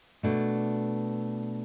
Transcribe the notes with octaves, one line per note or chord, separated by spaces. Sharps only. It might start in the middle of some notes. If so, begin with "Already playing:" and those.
B2 A3 D4